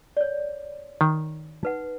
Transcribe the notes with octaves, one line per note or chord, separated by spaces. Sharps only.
C#5 D5
D#3
D#4 B4 F#5